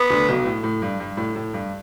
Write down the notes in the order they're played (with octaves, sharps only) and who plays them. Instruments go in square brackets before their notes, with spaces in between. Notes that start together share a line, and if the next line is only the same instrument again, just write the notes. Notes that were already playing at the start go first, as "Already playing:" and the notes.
Already playing: [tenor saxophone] B3
[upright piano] D2 D3
B1 B2
A2
A2
G2
G2
A2
A2
G2